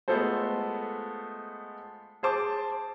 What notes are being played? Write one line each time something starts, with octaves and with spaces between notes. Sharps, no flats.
G#3 A3 B3 F4 A4 C5
G#4 C5 A5 D6